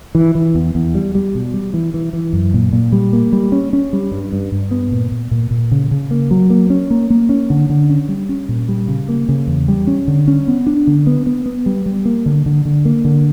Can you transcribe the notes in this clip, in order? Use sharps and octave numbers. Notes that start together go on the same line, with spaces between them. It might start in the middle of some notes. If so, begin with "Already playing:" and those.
E3
E3
E2
E2
G3
G3
B2
G3
E3
E3
E3
F#2
A#2
A#2
G3
A#3
G3
C#4
C#4
G3
G2
G2
G2
B3
A#2
A#2
A#2
A#2
C#3
C#3
A#3
F#3
A#3
C#4
A#3
A#3
C#4
D3
D3
C#4
G3
C#4
A#2
G3
C#3
A#3
C#3
E2
G3
C#4
D3
C#4
B3
D4
D3
B3
B3
B3
G3
G3
A#3
D3
D3
D3
A#3
D3